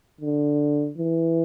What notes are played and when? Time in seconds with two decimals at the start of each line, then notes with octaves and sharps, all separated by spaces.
0.20 D3
0.98 E3